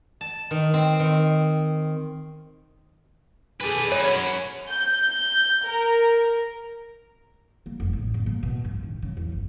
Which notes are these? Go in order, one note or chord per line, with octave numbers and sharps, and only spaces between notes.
A5
D#3
C4
D#3
G#4 A4 B4 D5
F#2 C#5 B5
G6
A#4
A#3
F1
A1
F#1
A#3
B2
G2
D#3
C#3
E2
G1